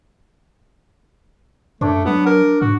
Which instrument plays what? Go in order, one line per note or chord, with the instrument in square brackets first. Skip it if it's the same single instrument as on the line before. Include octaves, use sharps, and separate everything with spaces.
[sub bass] F#2 [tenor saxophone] A3 [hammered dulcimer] D4 C#5 D5
[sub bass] F#3 [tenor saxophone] B3
[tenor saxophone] A#4
[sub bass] G#2 [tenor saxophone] F#4